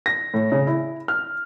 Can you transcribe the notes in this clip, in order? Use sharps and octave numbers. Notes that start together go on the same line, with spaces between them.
A#6
A2
C#3
E4
F6